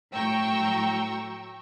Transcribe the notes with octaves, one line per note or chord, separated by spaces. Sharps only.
A2 F#3 G5 A#5 C#6 E6